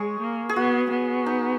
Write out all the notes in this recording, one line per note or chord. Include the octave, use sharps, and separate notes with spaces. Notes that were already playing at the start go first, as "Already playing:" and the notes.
Already playing: G#3 G#4 C#5
A#3
G#4
B3 F#4
B3
D#4